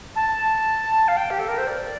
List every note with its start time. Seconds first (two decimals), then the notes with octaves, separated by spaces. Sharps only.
0.15 A5
1.08 F5
1.16 G5
1.30 G4
1.39 A4
1.48 A#4
1.57 C5
1.67 D5